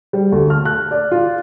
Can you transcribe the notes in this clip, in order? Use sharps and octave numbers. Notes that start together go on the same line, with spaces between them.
G3
D2
F6
F#6
D5
F4